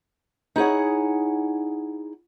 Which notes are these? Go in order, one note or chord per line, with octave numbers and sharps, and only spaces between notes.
D#4 E4 G#4 C#5 F#5